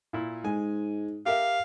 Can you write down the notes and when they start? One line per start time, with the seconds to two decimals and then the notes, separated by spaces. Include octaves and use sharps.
0.13 A#2 E4
0.44 G#2 G#3 G#5
1.26 G4 A#4 E5 F5